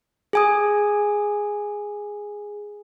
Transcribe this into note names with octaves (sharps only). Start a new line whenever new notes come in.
G#4 G#5 D#6